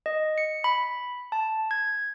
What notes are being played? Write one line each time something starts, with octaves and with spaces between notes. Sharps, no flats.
D#5
C#7
B5
A5
G#6